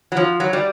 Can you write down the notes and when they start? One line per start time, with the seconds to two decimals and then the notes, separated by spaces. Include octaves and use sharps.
0.12 F#3
0.17 F3
0.40 F#3
0.53 G3